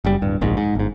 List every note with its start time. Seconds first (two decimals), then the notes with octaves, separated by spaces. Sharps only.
0.05 F#1 G3
0.22 D1 G2
0.41 D1 A#1 G#2
0.57 G#2
0.75 G1 G#2